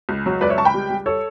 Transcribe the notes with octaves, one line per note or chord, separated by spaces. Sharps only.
C#2
F#3
C#2 B4 D5
C#5 E5
C#2 A5 C#6
G5 B5
G3
G3
A4 C#5